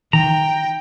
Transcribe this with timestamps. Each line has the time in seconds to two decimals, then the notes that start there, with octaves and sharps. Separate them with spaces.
0.13 D#3 G5 A#5